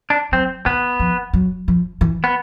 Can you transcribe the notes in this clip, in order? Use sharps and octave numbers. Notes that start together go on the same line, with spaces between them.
D4
F#3 C4
D#3 B3
F3
F#3
F3
E3
B3